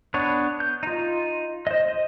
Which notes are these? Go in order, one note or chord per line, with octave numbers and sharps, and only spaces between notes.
B3 D4 C#5
G6
D#4 F4
C5 D#5
D#5